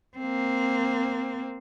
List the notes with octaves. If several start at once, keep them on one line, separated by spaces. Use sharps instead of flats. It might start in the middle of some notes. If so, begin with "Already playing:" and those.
A#3 C4